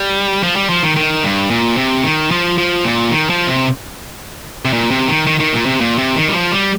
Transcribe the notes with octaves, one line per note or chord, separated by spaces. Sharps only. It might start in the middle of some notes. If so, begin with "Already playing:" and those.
Already playing: G3
F3
G3
F3
D#3
D#3
G2
A#2
C3
D#3
F3
F3
A#2
D#3
F3
C3
C3
A#2
C3
D#3
D#3
D#3
A#2
C3
A#2
C3
D#3
G3
F3
G3